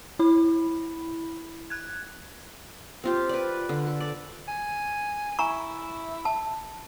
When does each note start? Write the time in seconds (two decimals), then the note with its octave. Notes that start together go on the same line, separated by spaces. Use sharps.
0.19 E4 B5
1.70 F#6 G#6
3.04 C4 F4 G4
3.29 B4 D5
3.69 D3
3.87 A4
4.00 D5
4.48 G#5
5.39 E4 G#5 A#5 C#6
6.25 A5